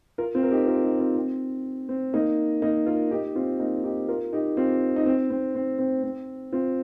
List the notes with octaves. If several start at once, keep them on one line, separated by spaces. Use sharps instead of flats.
F4 A#4
C4 F4
A#4
D#4 G4
F4 A#4
D#4 G4
C4 F4
C4
C4
A#3 D#4
A#3 D#4
F4 A#4
D#4 G4
C4 F4
A#3 D#4
D#4 G4
F4 A#4
D#4 G4
C4 F4
D#4
C4
C4
C4
C4
C4
C4 F4